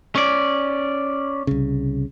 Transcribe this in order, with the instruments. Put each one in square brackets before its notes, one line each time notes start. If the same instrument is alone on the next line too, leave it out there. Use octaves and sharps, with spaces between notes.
[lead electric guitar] C#4 D5
[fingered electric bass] C2 C#3